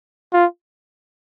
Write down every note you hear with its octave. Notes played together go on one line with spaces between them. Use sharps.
F4